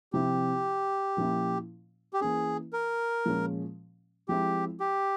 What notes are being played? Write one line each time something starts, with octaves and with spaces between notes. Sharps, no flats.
C3 F3 C4 E4 G4
A#2 F3 A#3 C#4 E4
G4
E3 A#3 C#4 G#4
A#4
A#2 F3 G#3 C#4
F3 G#3 C4 E4 G4
G4